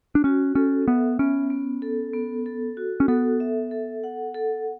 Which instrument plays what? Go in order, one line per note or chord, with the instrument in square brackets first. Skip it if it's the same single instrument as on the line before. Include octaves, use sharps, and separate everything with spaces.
[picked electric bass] D4
[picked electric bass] C#4 [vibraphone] F#4
[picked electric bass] C#4 [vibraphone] A4
[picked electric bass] B3 [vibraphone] E5
[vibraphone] B3 [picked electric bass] C#4
[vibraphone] B3
A4
B3
A4
F#4
[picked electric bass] C#4
[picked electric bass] B3 [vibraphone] A4
[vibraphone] E5
A4
F#5
A4